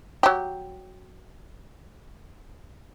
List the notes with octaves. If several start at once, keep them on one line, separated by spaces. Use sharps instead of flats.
F#3 G4